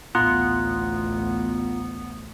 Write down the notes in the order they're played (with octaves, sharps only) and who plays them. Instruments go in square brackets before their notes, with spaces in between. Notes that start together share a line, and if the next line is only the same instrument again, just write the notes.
[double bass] A1 D2 [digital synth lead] B3 [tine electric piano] F4 A#5 [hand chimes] C6 F#6